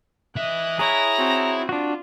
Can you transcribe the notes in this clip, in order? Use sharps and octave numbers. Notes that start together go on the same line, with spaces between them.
E3 D#5 E5 F#6
E4 G#4 C#5 A#5
C4 F#4
D4 F4 F#4